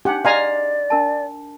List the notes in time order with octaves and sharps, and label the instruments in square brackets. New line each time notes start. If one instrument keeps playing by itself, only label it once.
[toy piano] D4 D#4 [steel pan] G4 F#5
[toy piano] G#4 D#5 C6 [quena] D5 [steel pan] F5 G#5 A#5
[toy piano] D4 A#4 A5